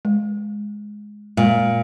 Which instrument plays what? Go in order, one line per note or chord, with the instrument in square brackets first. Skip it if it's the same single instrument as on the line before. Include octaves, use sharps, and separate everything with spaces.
[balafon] G#3
[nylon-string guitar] A#2 [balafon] G#3